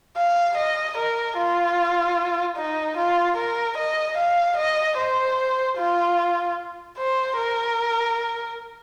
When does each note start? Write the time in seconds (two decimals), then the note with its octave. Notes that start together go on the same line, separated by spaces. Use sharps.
0.17 F5
0.57 D#5
0.98 A#4
1.37 F4
2.57 D#4
2.97 F4
3.37 A#4
3.77 D#5
4.17 F5
4.57 D#5
4.97 C5
5.77 F4
6.98 C5
7.37 A#4